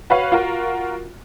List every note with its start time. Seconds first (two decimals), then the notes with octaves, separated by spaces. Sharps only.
0.10 F#4 B4 C#5 F5
0.32 F4 F#4 A#4